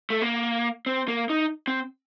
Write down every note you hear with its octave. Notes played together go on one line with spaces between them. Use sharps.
A3
A#3
C4
A#3
D#4
C4